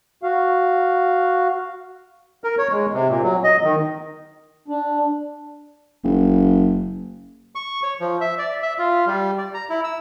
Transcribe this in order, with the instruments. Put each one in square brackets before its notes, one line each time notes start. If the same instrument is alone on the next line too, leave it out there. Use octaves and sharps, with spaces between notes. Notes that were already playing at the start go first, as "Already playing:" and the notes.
[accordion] F#4 F5
[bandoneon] A#4
C#5
G#3
C3
A#2
F#3
D#5
D#3
[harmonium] D4
[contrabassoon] F#1
[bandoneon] C#6
C#5
F3
E5
D5
E5
F4
G3
D5
A#5
E4
E6